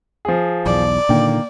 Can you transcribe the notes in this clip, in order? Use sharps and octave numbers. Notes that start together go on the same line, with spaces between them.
F3 G#4
B1 E2 D5
A#2 D3 D#3 A#3 G5